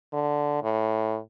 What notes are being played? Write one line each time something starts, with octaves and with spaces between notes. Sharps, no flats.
D3
A2